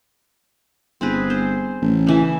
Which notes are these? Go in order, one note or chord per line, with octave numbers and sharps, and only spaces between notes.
G1 C4 G#4 B4
C5
A1
C#3 E3 E5